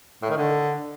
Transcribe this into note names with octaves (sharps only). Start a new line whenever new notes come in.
A2
D#3
D3